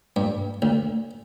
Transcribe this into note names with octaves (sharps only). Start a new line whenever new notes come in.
G2
D2